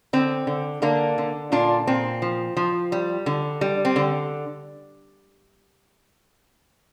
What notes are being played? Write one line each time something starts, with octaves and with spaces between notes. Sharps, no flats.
D3 C4
D3
D3 A#3 D4
D3
A#2 D4 F4
A#2 C4
F3
F3
G3
D3
G3
C4
D3